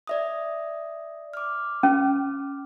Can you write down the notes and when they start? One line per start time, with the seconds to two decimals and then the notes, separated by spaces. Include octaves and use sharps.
0.07 D5 E5 D#6
1.34 D6 F6
1.83 C#4